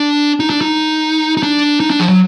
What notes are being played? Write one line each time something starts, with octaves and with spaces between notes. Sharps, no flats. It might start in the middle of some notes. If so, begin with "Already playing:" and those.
Already playing: D4
D#4
D4
D#4
D#4
D4
D#4
D4
F3
F#3